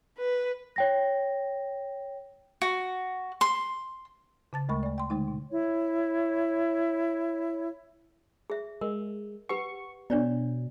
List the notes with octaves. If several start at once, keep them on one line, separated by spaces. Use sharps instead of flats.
B4
C#5 G5 A#6
F#4
C6
C#3 A5 A6
D2 G#3 A3 A#4 B5 C#6
A3 D5
G5 C6
D3 G#3 A3 D#4
B2
E4 C#5
G#4 E5
G#3 A#4
G4 B4 F#5 C#6
B2 D4 C#5 D5